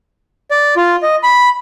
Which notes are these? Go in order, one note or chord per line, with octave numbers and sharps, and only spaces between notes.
D5
F4
D#5
B5